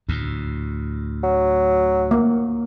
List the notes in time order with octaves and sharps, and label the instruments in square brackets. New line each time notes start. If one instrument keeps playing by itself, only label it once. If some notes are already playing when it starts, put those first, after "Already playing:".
[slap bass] D2 A2
[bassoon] F#3
[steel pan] A#3